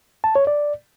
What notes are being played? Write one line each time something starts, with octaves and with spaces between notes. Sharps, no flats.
A5
C#5
D5